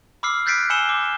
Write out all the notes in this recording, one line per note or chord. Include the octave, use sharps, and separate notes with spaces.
B5 D6 E6 F6 C7
F#6 G6 A6 B6 C7 D7
G#5 B5 E6 C#7 E7 G7
D6